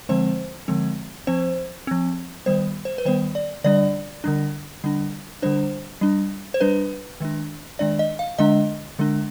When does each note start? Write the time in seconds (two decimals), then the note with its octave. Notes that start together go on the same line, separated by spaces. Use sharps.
0.09 D3 F3 G#3 C4 C5
0.68 D3 F3 G#3 C4
1.27 F3 C4 C5
1.87 F3 C4
2.46 D#3 G3 B3 C5
2.85 C5
2.98 B4
3.05 D#3 G3 B3 C5
3.35 D5
3.64 D3 G3 D4 D5
4.24 D3 G3 D4
4.84 D3 G3 D4
5.42 D3 G3 D4 C5
6.01 G3 D4
6.54 C5
6.61 G3 D4 B4
7.20 D#3 G#3 D4
7.79 D#3 G#3 D4 D5
7.99 D#5
8.19 F5
8.39 D3 G#3 D4 D#5
8.99 D3 G#3 D4